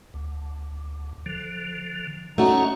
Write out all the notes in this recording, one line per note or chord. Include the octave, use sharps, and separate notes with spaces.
D2
D3 F3
A3 C#4 D#4 F#4 C#5